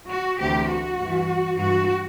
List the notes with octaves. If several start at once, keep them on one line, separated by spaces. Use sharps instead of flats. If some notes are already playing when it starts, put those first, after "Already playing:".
F#4
D2 C3 E3 G4
F#4
G2 E3
G2 E3 F#4